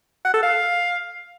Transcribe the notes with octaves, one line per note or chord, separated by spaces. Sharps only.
F#5
A4
F5